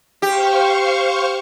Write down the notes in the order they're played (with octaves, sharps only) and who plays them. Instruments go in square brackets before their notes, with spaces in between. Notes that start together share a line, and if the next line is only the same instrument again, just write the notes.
[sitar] G4 [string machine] C5 F5 C#6